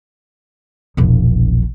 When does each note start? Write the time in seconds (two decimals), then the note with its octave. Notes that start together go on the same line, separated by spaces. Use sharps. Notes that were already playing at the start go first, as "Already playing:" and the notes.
0.97 E1 A#1